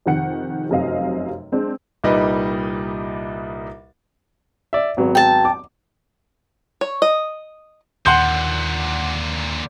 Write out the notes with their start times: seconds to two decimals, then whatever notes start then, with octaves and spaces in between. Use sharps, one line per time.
0.06 F2 C3 D#3 F#5 C#7
0.69 F1 F#2 C3 D#5 F5
1.52 G#3 C4 D4
2.04 C2 A#2 G3 D#4 B4 D#5
4.73 D5 E5
4.97 G#1 F#3 B3
5.15 G5 A5
5.45 D6
6.81 C#5
7.02 D#5
8.06 D#2 A#2 D3 F#5 C6 G6